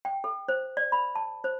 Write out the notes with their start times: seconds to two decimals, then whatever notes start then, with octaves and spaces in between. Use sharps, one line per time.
0.05 G5
0.24 A4
0.48 C5
0.77 D5
0.92 B5
1.16 A5
1.44 C5